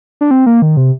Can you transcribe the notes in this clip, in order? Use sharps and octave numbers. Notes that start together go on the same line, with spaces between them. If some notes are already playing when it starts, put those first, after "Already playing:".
D4
C4
A#3
D#3
C3